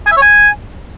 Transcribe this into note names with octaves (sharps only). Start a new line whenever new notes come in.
G#5
E5
C#5
G#5